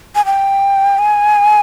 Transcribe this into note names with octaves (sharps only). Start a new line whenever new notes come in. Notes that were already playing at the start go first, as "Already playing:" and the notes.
G#5
G5
G#5